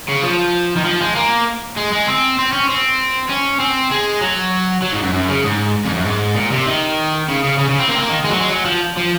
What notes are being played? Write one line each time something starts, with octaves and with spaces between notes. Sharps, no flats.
C#3
F3
D#3
F3
G#3
A#3
G#3
G#3
C4
C4
C#4
C4
C#4
C4
G#3
F#3
F#3
G#2
F#2
F#2
C#3
G#2
F2
F#2
G#2
A#2
C3
D#3
C#3
C#3
C#3
C#3
C4
A#3
C4
A#3
D#3
G#3
F#3
G#3
F#3
F3
F3